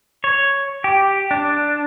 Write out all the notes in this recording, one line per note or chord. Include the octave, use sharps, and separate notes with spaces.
C#5
G4
D4